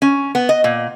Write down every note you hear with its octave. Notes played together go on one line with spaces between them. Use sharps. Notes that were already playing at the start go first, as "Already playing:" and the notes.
C#4
B3
D#5
A#2